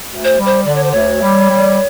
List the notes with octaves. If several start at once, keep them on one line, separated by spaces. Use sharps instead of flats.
D2
C5
G3
C5
D3 D5
C#5
C5
D2 C#5
G3
G3